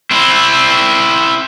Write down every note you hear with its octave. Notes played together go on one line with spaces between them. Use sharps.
C4 E4